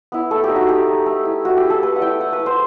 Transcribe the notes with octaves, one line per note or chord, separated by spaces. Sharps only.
B3 E4
A3 A4
G4
D#4
F#4
A3 G4
D#4
A3
E4
A3 F#4
G4
E4
A4
A3 B4
F#5
E4 G5
A3 F#5
B4
E4
C5